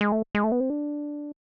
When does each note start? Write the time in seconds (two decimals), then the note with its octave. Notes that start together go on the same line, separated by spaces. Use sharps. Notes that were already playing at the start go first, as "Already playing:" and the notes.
0.01 G#3
0.12 A3
0.35 G#3
0.44 A3
0.52 B3
0.60 C4
0.70 D4